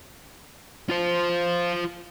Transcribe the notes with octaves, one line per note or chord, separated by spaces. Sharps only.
F4 C5